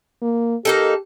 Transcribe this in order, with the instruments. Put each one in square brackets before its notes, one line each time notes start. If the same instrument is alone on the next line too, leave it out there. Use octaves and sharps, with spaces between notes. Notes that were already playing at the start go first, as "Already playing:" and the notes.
[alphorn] A#3
[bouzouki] A#3 D#4 A4 [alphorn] G4